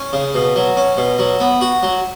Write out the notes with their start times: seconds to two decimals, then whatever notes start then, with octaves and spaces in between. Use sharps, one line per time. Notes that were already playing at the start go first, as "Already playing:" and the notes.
Already playing: C#4
0.13 C#3
0.35 B2
0.56 F#3
0.77 C#4
0.97 B2
1.19 F#3
1.40 B3
1.61 F#4
1.83 F#3